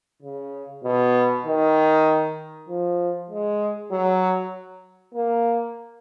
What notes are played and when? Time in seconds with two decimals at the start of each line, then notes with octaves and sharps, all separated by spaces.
0.23 C#3
0.84 B2
1.46 D#3
2.69 F3
3.31 G#3
3.91 F#3
5.14 A#3